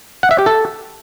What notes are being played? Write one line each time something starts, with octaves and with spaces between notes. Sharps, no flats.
F#5
E5
G4
A4